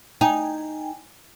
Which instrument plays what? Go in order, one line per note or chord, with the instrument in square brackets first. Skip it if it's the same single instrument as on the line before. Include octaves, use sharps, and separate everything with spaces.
[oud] D#4 [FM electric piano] G5 G#5